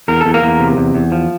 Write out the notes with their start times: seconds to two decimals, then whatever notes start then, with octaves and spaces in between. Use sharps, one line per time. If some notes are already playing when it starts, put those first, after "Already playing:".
0.08 E2 A#4
0.21 E2 A4
0.34 A#3 A#4
0.42 E2
0.60 C3
0.77 E2
0.94 E2
1.12 F3